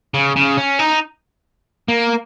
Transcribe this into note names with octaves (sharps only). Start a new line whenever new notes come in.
C#3
C#3
C#4
D#4
A#3